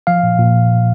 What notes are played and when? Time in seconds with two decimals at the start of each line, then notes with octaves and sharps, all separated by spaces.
0.07 F3 F5
0.23 A#2
0.39 A#2